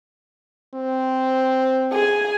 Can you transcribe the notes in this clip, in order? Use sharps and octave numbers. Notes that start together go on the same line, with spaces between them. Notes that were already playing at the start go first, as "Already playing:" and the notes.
C4
G#4 G#5